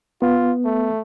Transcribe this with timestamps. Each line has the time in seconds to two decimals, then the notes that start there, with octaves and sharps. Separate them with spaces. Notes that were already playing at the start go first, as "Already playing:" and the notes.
0.22 B3 F4
0.65 A3